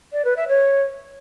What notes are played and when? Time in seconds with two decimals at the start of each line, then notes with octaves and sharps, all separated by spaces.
0.13 D5
0.25 B4
0.36 E5
0.48 C#5